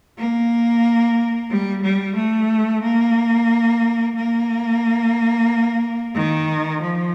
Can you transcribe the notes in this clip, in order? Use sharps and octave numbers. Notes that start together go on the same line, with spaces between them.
A#3
G3
G3
A3
A#3
A#3
D#3
F3